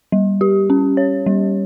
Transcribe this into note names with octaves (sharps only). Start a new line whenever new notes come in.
G3
G4
C#4
C#5
G3